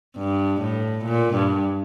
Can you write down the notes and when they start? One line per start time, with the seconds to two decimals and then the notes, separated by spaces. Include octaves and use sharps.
0.17 G2
0.61 A2
1.05 A#2
1.35 G2